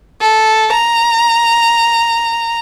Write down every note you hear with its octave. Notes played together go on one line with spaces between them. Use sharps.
A4
A#5